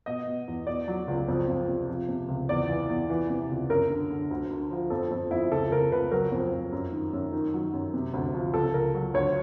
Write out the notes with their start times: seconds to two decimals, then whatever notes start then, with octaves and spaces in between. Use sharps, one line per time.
0.06 B2 D#5
0.27 B2
0.48 E2
0.67 B2 D5
0.88 F#3
1.08 C#2
1.28 F2
1.48 F2
1.68 C3
1.89 F3
2.09 C3
2.28 C#2
2.49 E2 D5
2.68 E3
2.89 E2
3.10 E3
3.30 C3
3.49 C#2
3.69 F#2 A#4
3.90 D3
4.10 D3
4.31 D2
4.50 D3
4.71 F3
4.90 F2 A4
5.11 F2
5.31 F2 E4
5.51 C#2 A4
5.72 C#2 A#4
5.92 C#2 B4
6.12 F#3 A#4
6.32 F2
6.53 F2
6.72 F#2
6.92 D#3
7.13 F#2
7.32 D#3
7.54 F#3
7.73 F#2
7.94 C3
8.14 D2
8.34 F3
8.54 C#2 A4
8.74 C#2 A#4
8.95 F#3
9.14 D2 C#5